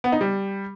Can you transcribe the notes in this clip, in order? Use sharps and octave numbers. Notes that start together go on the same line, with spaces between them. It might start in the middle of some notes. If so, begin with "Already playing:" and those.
B3
D#4
G3